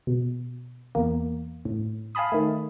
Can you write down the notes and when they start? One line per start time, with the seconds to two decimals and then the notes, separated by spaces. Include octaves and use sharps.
0.07 B2
0.95 E2 A#3
1.65 A2
2.15 F5 G#5 A5 B5 D#6
2.32 D#3 A3